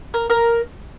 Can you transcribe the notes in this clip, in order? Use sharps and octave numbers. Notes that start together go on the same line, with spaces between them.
A#4
A#4